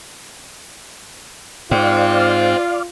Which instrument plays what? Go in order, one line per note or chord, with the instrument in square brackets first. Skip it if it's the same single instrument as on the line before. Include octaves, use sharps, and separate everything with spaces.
[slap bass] G#2 [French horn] F4 [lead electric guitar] C5 G5 [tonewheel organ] D5 F5